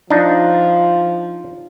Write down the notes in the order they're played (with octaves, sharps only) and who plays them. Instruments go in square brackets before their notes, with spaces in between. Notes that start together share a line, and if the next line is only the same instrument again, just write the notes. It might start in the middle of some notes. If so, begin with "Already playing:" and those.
[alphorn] F3 [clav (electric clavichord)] D4 D#4